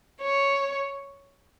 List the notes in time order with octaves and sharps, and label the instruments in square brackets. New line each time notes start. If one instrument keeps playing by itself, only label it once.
[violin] C#5